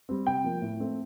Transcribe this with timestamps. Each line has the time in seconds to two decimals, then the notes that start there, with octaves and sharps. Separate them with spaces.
0.09 G3 C4
0.26 C3 G5
0.44 F3 A#3
0.62 A2
0.80 A3 C4